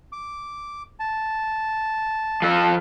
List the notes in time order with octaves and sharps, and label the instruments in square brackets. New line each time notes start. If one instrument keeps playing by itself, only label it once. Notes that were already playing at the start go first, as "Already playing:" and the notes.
[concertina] D6
A5
[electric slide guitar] F3 A4